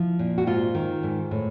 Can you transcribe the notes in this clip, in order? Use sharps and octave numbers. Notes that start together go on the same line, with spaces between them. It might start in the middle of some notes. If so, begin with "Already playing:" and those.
Already playing: F3 E4
A#2
F#4
G#2 F4
D#3
G#2
A2